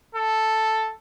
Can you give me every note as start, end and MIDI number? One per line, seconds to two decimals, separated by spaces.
0.15 0.94 69